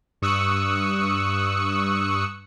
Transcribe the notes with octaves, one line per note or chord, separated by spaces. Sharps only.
G2 C#6 D#6 E6 F#6 C#7